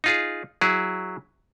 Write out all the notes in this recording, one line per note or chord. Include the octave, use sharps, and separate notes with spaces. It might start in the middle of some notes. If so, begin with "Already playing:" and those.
D#4 F4 G#4
F#3 E4 G#4